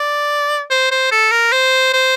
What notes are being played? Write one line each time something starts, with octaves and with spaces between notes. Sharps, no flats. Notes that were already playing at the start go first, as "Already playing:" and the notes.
Already playing: D5
C5
C5
A4
A#4
C5
C5